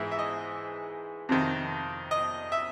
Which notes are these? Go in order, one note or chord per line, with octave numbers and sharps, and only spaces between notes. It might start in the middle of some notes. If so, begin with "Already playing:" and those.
Already playing: G#2 E3 G#3 E5
E5
D#5
F2 C3 D#3
D#5
E5